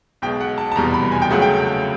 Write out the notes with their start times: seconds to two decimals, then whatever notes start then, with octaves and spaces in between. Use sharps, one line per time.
0.22 B1 B2 G#3 G5
0.41 F#5
0.58 A5
0.72 A5
0.76 F1 E2 B2 G3 A#5
0.94 B5
1.12 G#5
1.22 G5
1.30 C#2 C#3 F#3 A3 F#5
1.42 G5